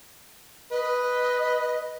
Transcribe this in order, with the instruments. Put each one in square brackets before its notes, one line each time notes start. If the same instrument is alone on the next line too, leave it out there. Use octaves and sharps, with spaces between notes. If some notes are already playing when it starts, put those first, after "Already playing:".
[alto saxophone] B4 [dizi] D#5